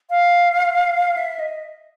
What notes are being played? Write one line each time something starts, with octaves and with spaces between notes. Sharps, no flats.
F5
E5
D#5